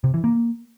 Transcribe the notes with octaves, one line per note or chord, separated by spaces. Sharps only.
C3
E3
A#3